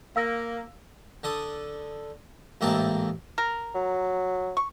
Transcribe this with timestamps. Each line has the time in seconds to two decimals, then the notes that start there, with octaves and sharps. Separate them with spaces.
0.16 A#3 F5 E6 A#6
1.23 D3 A4 D#6
2.61 A1 G#2 A#3 C4 E4 A5
3.38 A#4
3.75 F#3
4.57 C#6